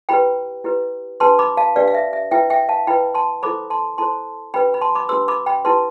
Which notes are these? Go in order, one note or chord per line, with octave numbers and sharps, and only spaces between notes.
E4 G4 B4 G5 B5
E4 G4 B4
D4 G4 B4 A5 C6
B5 D6
F5 A5
D4 G4 B4 D5 F5
F5
E5
E5
E4 B4 E5 G5
E5 G5
F5 A5
E4 B4 G5 B5
A5 C6
E4 A4 C5 B5 D6
A5 C6
E4 A4 C5 A5 C6
D4 G4 B4 G5 B5
B5
A5 C6
B5 D6
D4 G4 B4 C6 E6
B5 D6
G5 B5
E4 G4 B4 A5 C6